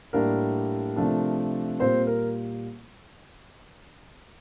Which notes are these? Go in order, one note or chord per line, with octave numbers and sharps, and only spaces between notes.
A2 G3 A#3 D4 A#4
C3 F3 A3 D4
A#2 G3 A#3 C4 C5
A#4